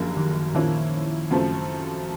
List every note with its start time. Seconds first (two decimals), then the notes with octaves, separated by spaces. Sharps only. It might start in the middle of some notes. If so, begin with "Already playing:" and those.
Already playing: F#1 F#2 D3 F3 G3 A#3
0.17 D#3
0.55 A#2 D#3 F3 A#3 C#4 E4
1.30 F#2 C#3 F3 A3 C4